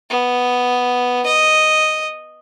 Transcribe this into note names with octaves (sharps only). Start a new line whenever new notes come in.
B3
D#5